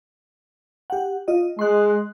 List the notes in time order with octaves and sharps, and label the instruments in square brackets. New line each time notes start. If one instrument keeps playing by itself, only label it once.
[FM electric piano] G4 F#5
F4 D#5
[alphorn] G#3 [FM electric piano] C6 F#6